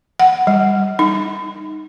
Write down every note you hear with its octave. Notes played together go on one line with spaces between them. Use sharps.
F#5
G3
D#4